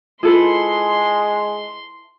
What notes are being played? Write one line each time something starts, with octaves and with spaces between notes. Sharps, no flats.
G#3 E4 F4 A4 B4 C6